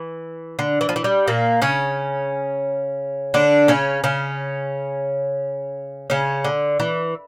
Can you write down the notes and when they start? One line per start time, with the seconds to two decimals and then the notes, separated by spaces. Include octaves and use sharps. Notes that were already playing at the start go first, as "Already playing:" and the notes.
Already playing: E3
0.59 D3
0.81 E3
0.89 F3
0.96 E3
1.04 G3
1.28 A#2 A#3
1.62 C#3 C#4
3.34 D3 D4
3.68 C#3 C#4
4.04 C#3 C#4
6.10 C#3 C#4
6.45 D3
6.80 E3